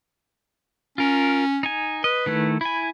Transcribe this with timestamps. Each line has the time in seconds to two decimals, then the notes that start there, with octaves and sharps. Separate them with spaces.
0.98 C#4 F4 A#4
1.63 D#4 G#5
2.04 B4 D#5
2.26 D#3 A3 E4
2.61 E4 G#5 B5